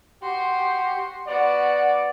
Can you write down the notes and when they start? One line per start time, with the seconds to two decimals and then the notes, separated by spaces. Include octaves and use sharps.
0.23 F#4 G4 C6
1.27 B3 F#4 D5